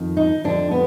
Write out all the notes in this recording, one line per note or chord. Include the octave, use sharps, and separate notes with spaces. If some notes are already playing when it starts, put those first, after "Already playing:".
Already playing: F2 D#3
D#4
F2 D3 D4
B3